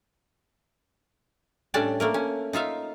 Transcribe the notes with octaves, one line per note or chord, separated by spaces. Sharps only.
A2 G3 C#4 D4 D5 A5
A3 A#3 A#4
C#4
D#4 F4 E5 F5